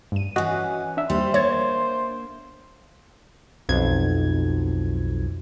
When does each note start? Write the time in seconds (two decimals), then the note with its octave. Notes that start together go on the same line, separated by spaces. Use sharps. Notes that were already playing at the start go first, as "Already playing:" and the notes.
0.12 G2 D#7
0.36 E3 C#4 F#4 D#5 F#6
0.97 D4 E5
1.10 D#2 G3 C5
1.34 A#3 C#5 G#6 A6
3.69 B1 F2 G#6